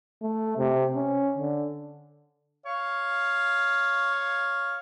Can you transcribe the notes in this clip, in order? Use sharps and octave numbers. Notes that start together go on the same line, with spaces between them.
A3
C3
C#4
D3
C#5 F5